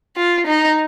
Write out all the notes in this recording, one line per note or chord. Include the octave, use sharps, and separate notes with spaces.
F4
D#4